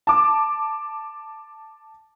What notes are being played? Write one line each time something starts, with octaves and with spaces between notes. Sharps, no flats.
A5 D6